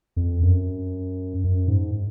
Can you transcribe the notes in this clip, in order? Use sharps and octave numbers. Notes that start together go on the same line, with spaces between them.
F2
F#2
F#2
G#2